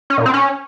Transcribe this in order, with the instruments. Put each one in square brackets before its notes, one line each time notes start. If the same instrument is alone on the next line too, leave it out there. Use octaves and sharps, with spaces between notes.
[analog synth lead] C#4
A#2
C4
C#4